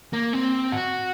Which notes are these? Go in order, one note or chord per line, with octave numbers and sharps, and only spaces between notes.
A#3
C4
F#4